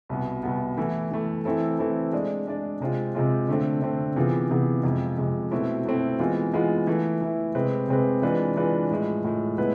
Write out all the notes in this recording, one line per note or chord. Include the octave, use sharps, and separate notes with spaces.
C2 B2 B3
C2 B2 B3
E3 A3 E4
E3 A3 E4
E3 A3 C4 E4 A4
E3 A3 C4 E4 A4
G#3 D4 G#4 D5
G#3 D4 G#4 D5
C3 G#3 C4 F4
C3 G#3 C4 F4
D3 A3 C4
D3 A3 C4
C3 E3 B3 F4 G#4
C3 E3 B3 F4 G#4
F2 C3 G#3
F2 C3 G#3
B2 A3 C4 E4
B2 A3 C4 E4
E3 G#3 B3 F4
E3 G#3 B3 F4
E3 A3 E4
E3 A3 E4
C3 G#3 C4 G#4 B4
C3 G#3 C4 G#4 B4
E3 G#3 D4 F4 B4
E3 G#3 D4 F4 B4
A2 F3 G#3
A2 F3 G#3
A2 G#3 B3 E4 B4